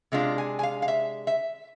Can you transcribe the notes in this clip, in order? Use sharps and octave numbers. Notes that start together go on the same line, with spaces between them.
C3 G#3 D4 F4
G#5
G#5
F5
F5
E5
E5